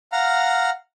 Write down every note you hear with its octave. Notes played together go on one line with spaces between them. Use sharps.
F5 F#5 A#5 F6